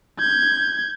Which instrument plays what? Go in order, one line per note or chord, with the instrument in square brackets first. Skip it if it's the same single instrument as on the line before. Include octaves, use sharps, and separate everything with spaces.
[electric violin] G6 G#6